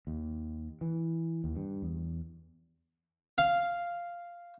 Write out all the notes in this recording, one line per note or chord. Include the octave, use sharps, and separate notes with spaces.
D#2
E3
D#2
G2
E2
F5